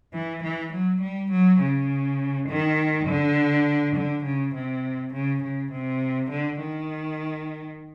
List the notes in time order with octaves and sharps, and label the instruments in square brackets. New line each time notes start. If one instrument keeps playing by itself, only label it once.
[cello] E3
E3
F#3
G3
F#3
C#3
D#3
D3
D3
C#3
C3
C#3
C#3
C3
D3
D#3